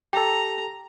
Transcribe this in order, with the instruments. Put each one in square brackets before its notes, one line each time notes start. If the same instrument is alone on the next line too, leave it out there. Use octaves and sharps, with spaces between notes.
[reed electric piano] G4 A4 [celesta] G5 [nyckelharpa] A#5